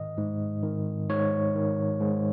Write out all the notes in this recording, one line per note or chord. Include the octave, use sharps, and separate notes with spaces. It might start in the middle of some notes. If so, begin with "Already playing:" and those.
Already playing: G#2 D#3 D#5
G#2
D#3
G#2 C#5
D#3
G#2